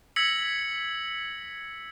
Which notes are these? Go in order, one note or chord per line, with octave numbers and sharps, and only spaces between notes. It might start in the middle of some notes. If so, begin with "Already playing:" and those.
E6 G#6 A#6 B6 C#7 F#7